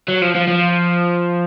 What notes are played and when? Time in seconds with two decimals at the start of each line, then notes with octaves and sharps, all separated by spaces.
0.08 F#3
0.22 F3
0.35 F3
0.47 F3